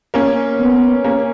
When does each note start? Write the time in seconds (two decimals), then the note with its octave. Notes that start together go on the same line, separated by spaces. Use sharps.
0.14 A#3 C#4
0.60 B3
1.04 A#3 C#4